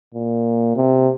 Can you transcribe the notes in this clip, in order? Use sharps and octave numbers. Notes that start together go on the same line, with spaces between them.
A#2
C3